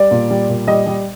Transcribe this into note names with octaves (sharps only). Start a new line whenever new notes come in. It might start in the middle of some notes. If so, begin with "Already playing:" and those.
Already playing: G3 D5
A#2
G3
A#2
G3 D#5
G3